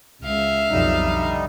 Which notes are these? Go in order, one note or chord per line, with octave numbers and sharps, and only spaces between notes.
C#2 E5 F5
B1 F2 F3 G3 D#4
D3